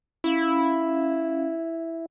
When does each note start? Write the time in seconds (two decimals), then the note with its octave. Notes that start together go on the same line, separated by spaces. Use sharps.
0.24 C#4 E4 F5